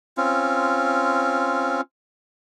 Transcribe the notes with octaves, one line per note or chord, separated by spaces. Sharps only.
C4 C#4 F4